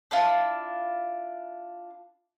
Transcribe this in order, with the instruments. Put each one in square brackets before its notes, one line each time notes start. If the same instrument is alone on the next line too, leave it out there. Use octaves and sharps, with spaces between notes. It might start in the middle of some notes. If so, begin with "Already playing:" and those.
[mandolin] D4 E4 F4